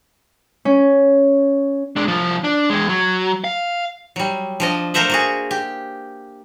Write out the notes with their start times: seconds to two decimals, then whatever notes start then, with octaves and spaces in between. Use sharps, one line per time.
0.65 C#4
1.96 G#3 D4
2.08 C2 F3
2.44 D4
2.70 E2 G#3
2.89 F#3
3.44 F5
4.16 F#3 G3
4.60 F3 D4 D#5
4.94 A3 A#3 A#4 C5 E5 F#5
5.10 A#3 F#4 G#4
5.51 G4